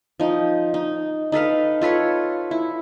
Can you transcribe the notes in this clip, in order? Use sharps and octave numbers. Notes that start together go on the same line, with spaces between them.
F3 D#4
D#4
D#4 A4 B4 F5
F4 A4 B4 C#5
E4